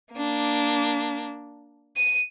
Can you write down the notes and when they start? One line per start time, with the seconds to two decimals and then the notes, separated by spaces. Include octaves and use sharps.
0.13 A#3 D4
1.96 D#7